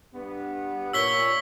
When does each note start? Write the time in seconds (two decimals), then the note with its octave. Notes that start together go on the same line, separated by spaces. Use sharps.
0.13 G2 B3
0.93 A#2 C#5 E6 B6 G7